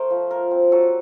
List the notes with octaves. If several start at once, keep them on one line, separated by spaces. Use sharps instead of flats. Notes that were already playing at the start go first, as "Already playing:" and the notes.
Already playing: A3 A#4 C5
F3
F4 A#4
C4
F#3 A4